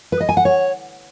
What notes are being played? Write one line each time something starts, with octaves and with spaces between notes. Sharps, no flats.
B4
D#5
G#5
F#5
C#5